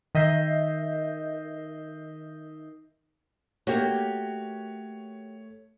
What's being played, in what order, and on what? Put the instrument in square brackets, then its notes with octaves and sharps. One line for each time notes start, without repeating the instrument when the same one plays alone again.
[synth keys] D#3 D#5 E5 G6 C7
[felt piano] A3 C#5 [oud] A#3 [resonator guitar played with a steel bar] F#4 G4